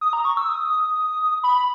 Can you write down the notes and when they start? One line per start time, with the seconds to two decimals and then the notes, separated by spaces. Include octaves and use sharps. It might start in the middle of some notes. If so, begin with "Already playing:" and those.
0.01 D#6
0.13 A#5
0.25 C#6
0.37 E6
0.49 D#6
1.43 B5